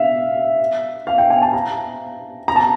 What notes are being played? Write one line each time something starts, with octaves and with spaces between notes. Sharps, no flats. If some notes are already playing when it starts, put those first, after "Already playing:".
Already playing: E5 F5
F5
G5
G#5
A5
A#5
A#5
A5